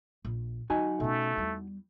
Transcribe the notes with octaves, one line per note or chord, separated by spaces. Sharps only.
A#1
F#3 D#4 F#4 G#5
B2 A3 C#4
E2 G3